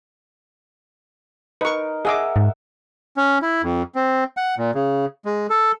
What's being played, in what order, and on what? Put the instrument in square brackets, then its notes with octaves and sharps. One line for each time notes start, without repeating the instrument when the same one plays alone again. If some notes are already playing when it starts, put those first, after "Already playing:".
[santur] D#4 A#4 [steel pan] B4 C#6
[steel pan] G#4 D#5 D6 [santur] E5 F#5
[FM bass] G#2
[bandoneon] C#4
E4
F2
C4
F#5
A#2
C#3
G#3
A4